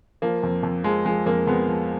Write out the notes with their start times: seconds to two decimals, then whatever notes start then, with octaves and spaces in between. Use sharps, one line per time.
0.22 F3 A#3
0.43 F2
0.63 F2
0.84 F3 G#3
1.05 F3 G#3
1.26 F2 A#3
1.47 F2 G#3 B3
1.68 F3